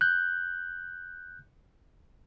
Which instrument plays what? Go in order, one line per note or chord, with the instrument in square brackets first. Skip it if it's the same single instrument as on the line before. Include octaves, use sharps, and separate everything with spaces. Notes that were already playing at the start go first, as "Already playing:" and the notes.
[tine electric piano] F#6 G6